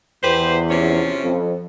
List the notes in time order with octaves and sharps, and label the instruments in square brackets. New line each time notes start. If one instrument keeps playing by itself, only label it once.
[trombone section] E2 [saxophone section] G4 B4 C5
[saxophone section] C3 F3 C#4
[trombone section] F2